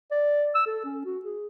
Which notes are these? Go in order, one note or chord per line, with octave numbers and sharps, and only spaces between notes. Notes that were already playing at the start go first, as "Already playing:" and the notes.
D5
E6
A4
C#4
F#4
G#4